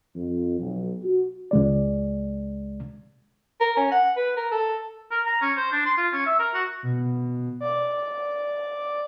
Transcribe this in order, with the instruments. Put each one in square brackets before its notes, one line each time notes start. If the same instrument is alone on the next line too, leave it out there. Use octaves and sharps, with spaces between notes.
[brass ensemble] F2
B1
F#4
[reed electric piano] C#2 G#3 D5
[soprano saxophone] A#4
C#4
F#5
B4
A#4
A4
[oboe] A#4
A#5
C#4
C5
D4
C6
F4
C#4
E5
A#4
F#4
[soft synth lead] B2
D5